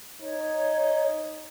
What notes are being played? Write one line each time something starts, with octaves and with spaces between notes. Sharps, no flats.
D#4 C#5